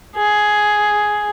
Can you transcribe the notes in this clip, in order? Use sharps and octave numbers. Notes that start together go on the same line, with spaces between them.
G#4